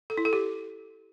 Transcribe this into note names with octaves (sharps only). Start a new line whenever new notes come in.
A4
E4
A4
G4